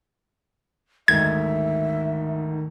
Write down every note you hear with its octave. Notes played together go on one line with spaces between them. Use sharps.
D2 G#2 D#3 E5 G#6